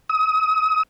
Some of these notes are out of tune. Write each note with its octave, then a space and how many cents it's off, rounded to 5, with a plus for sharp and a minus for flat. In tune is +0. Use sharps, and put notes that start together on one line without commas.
D#6 +35